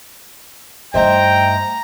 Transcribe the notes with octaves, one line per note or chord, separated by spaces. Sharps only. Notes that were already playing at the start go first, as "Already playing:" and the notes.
G2 A3 D#4 C5 E5 G5 A#5